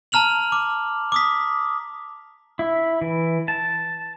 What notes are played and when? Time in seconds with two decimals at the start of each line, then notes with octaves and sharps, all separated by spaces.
0.12 A5 A#5 F6 F7 F#7
0.52 D6
1.12 D6 D#6 B6
2.59 E4
3.01 E3
3.48 A5